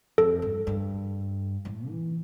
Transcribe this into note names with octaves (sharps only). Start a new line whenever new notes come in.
F2 A4
G2
G2
A2
E3